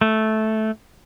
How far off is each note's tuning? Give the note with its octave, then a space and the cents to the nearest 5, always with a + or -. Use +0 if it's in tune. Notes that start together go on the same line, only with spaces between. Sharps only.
A3 -10